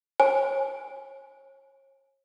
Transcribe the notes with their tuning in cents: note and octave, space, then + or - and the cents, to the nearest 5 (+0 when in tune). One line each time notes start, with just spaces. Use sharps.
C#5 -40 G#5 +10